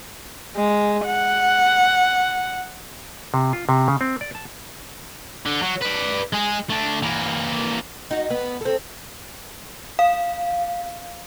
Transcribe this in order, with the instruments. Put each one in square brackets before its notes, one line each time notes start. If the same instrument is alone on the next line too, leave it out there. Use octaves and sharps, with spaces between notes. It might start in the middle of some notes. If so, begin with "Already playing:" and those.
[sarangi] G#3
F#5
[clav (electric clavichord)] C3
F4
C3
C#3
C4
D5
A5
[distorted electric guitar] D3
F#3
B4 D5
G#3 G#4
A3 D4
E3 A#3
[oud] D#4 F#4
B3
C4 A4
[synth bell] F5